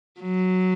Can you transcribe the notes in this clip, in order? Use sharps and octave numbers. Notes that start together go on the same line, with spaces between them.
F#3